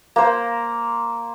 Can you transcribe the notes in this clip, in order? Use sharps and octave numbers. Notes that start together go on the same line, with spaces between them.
A#3 C5